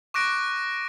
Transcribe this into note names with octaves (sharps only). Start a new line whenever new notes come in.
C#6 D6 F#6 A#6 D7